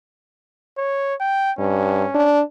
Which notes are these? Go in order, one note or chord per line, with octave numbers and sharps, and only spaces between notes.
C#5
G5
G2 C#4
D4